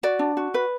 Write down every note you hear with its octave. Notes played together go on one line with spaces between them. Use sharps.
F#4 D5
D4
F#4
B4